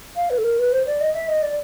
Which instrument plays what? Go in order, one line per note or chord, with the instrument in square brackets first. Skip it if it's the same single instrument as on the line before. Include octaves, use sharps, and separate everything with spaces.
[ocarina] F5
B4
A4
A#4
B4
C5
D5
D#5
E5
D#5
D5